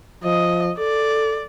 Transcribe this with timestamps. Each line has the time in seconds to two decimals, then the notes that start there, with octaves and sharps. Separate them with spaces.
0.24 F3 D#5
0.79 A4 D5